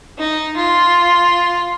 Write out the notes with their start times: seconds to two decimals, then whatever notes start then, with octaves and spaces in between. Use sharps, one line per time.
0.18 D#4
0.56 F4